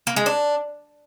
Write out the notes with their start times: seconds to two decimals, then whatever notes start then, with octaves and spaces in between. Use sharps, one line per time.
0.07 A#3
0.16 G#3
0.26 D4